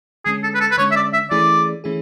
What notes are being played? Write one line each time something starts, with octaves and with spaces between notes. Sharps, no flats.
D3 G#3 C#4 G#4
A4
B4
A4
B4
D3 G#3 C#4 C#5
E5
D5
E5
E3 A3 C#4 E4 G#4 D5
E3 A3 C#4 E4 G#4